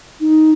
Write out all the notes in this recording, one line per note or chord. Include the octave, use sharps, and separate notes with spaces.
D#4